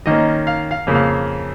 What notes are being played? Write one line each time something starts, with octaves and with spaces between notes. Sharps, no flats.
D#3 A#3 C#4 D#5
F5
F5
F2 C#3 A#3
F5